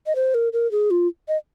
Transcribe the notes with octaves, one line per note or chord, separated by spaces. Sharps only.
D#5
C5
A#4
A#4
G#4
F4
D#5